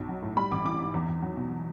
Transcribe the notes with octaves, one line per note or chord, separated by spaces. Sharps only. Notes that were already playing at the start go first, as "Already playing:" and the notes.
Already playing: B1
F#3
A2
G3 B5
A1 D6
E3 D6
G#2
E2
E2
F#3
B2